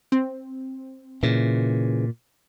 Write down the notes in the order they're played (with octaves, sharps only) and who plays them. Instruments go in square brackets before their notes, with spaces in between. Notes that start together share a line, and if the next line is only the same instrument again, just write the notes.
[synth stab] C4
[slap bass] A#2 [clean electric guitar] C#3 E3